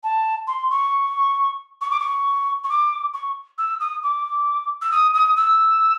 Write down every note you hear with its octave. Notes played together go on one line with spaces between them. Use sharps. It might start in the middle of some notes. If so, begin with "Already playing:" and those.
A5
C6
C#6
C#6
D6
C#6
C#6
D6
C#6
E6
D#6
D6
E6
D#6
D#6
E6